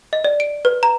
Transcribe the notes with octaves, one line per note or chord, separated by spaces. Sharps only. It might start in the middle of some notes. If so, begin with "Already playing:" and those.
D#5
D5
D7
B4
A#5